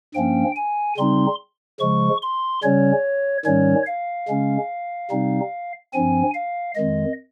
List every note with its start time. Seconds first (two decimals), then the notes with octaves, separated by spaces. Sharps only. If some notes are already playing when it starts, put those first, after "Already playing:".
0.14 G2 F3 A#3 C#4 G5
0.56 G#5
0.97 C#3 G3 C4 D#4 C6
1.80 C#3 F3 G#3 C#6
2.22 C6
2.63 C#3 G3 C#4 C#5
3.45 G#2 D#3 G3 C#4 C#5
3.87 F5
4.28 C#3 G#3 C#4
5.11 C3 G3 C4 D#4
5.93 G2 F3 C4 G#5
6.34 F5
6.76 F2 D#3 G#3 D#5